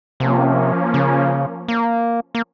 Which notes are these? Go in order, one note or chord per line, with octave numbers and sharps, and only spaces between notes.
C3 F3 A#3 C#4
C#3
A#3
A#3